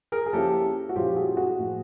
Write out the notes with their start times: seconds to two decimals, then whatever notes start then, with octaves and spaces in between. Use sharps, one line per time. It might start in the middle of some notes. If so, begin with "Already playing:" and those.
0.12 G#4 A#4
0.26 G#4
0.33 F3 A#3 C#4 E4 G4 A4
0.89 F#4
0.96 A#2 F3 G#3 C#4 E4 F4 G4
1.16 F#4 G#4
1.37 F#4 G#4
1.58 A2 F3 A#3